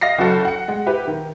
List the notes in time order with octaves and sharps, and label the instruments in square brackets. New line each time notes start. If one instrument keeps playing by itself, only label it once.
[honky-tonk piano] D#5 F5 A#6 C7
F#1 F#3 F#4 A4 C#7
F#5 C#7
G#3 F#5
E4 G4 B4
D#3